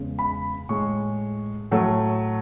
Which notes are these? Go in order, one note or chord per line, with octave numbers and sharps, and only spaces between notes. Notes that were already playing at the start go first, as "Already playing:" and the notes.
Already playing: E2 C#3 G#3
B5
A2 G#3 C#6
A2 F#3 A3